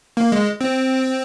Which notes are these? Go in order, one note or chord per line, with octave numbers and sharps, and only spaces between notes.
A#3
G#3
C4